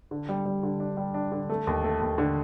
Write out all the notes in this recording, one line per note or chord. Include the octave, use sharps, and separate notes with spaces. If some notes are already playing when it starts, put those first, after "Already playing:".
D3
G3
G3
D3
D4
G3
D4
D3
A3
D#2
A3
D#2
D3